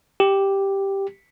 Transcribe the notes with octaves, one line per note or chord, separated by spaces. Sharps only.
G4